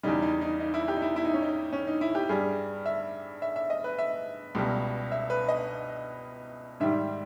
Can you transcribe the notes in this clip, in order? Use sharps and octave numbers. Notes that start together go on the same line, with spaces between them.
E2 C#3 G3 D#4
D#4
D#4
D#4
E4
G4
D#4
E4
E4
D#4
C#4
D#4
C#4
D#4
E4
G4
G2 G3 G#4
E5
E5
E5
D#5
B4
E5
C#2 B2 G3
E5
B4
D#5
G#2 D#3 G3 E5